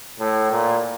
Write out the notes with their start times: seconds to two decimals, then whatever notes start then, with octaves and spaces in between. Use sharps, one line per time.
0.19 A2
0.50 A#2